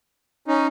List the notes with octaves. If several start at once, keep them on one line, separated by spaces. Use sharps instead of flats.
C#4 D#4